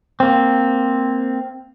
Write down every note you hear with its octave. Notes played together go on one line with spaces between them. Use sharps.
A#3 C4